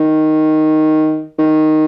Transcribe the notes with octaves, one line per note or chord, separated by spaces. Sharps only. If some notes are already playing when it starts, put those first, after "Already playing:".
Already playing: D#3
D#3